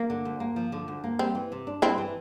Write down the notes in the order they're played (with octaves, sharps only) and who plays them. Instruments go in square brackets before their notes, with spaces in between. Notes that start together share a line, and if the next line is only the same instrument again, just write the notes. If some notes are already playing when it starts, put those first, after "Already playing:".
Already playing: [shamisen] A#3
[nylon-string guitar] D3
D2
A#3
F3
D3
D2
A#3
[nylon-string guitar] G3 [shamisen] C4
[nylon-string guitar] E3
C3
D4
[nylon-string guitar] G3 [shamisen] C4 E4
[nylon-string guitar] E3